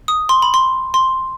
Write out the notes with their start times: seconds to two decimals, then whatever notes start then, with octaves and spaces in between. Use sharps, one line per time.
0.08 D#6
0.29 C6
0.42 B5
0.54 C6
0.94 C6